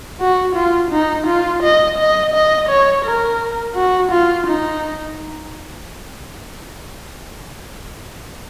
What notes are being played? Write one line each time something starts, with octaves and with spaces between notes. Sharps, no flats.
F#4
F4
D#4
F4
D#5
D#5
D#5
C#5
A#4
F#4
F4
D#4